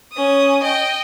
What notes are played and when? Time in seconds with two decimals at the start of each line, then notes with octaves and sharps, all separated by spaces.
0.13 C#4 D#6
0.63 D#5 G5